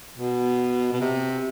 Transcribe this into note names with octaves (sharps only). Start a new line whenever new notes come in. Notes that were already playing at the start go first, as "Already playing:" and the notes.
B2
B2
C3